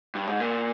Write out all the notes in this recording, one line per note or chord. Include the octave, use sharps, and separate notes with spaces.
G2
G#2
A#2